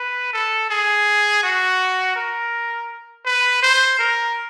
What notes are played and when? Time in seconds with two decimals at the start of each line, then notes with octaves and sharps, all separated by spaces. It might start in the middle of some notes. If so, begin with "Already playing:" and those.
Already playing: B4
0.33 A4
0.70 G#4
1.43 F#4
2.16 A#4
3.26 B4
3.62 C5
3.99 A#4